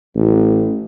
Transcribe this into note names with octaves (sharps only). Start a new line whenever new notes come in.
A1